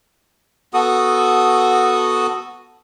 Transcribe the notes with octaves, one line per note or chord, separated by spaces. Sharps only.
B3 F#4 A4 D#6